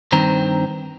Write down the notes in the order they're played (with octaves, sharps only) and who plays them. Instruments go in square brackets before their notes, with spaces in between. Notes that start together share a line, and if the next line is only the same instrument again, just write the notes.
[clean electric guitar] G2 D#3 C4 A#5